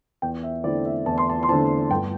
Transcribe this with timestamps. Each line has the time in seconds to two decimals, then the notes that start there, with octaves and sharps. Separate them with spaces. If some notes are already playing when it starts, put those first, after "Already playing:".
0.22 E2 G5
0.43 E5
0.64 D3 A3 C4 E4 D5
0.85 E5
1.06 E2 A5
1.18 C6
1.30 A5
1.43 C6
1.49 D3 A3 C4 E4 A5
1.91 G1 G5